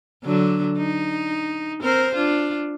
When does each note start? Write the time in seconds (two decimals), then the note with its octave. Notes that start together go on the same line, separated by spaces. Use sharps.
0.24 D3 F#3 D4
0.77 D#4
1.81 C4 A#4 C5
2.14 D4 F4